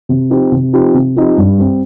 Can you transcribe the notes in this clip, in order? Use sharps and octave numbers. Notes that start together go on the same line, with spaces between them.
C3
F3 C4 D#4 G4
C3
F3 C4 D#4 G4
C3
F3 C4 D#4 G4
G2
G3 C4